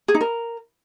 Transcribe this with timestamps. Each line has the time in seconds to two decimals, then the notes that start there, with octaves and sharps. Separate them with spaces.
0.08 G#4
0.15 D#4
0.21 A#4